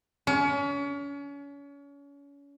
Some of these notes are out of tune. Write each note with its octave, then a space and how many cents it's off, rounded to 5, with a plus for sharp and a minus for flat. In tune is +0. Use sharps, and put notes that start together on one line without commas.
C#4 +35